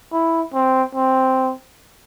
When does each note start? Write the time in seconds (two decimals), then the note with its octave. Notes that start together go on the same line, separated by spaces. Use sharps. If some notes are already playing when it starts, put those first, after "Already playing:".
0.13 E4
0.54 C4
0.95 C4